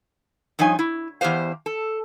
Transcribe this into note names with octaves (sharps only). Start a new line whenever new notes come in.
G2 F3 D#4 C#5 G#5
E4
E2 G#3 G4 C5 F5
A4